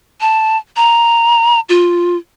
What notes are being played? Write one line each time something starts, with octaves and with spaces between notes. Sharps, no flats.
A5
A#5
F4